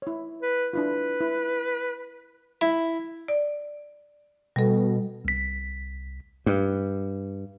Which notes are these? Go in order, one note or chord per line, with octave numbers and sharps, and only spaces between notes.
E4 C#5
B4
D4 E4 F4 B4
E4
E4
D5
B2 G3 A4
C2 B6
G2